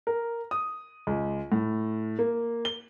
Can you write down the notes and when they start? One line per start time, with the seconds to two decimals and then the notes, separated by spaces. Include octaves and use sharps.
0.07 A#4
0.51 D#6
1.07 C#2
1.52 A2
2.19 A#3
2.65 G7